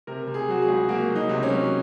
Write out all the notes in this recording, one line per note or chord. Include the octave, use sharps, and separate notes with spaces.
C3 A#4
C3
G#4
F#3 F#4
G#4
C#2
A#3 F#4
F#3
D#4
C3
C#4
F#3